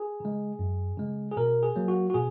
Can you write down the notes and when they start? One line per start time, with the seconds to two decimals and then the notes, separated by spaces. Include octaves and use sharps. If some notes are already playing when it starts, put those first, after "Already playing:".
Already playing: G#4
0.20 C#3 G#3
0.59 F#2
0.98 C#3 G#3
1.31 G#4
1.37 B2 A#4
1.63 G#4
1.76 F#3 A#3
1.88 F#4
2.10 F#4
2.14 B2 G#4